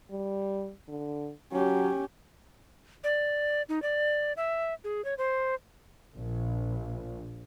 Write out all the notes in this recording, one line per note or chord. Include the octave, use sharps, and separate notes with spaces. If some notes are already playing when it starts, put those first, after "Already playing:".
G3
D3
F#3 C#4 G4
D5
D#4
D5
E5
G#4
C#5
C5
A#1